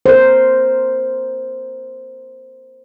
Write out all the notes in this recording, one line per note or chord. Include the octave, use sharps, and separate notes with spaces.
A#4 C5